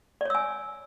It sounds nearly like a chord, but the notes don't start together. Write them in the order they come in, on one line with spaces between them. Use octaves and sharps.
D5 C#5 E6 G#5